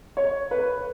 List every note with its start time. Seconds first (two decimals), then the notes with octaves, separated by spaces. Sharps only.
0.17 C#5
0.51 B4